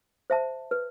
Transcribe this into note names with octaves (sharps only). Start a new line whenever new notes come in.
C5 E5 A5
B4